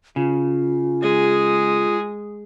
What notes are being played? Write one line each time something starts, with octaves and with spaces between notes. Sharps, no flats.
C#3 F4
G#3 G#4